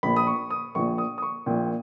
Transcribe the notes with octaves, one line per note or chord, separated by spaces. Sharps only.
A#1 A#2 B5
D#6
C#6
D#6
A#1 A#2 C#6
D#6
D#6
C#6
A#1 A#2 G5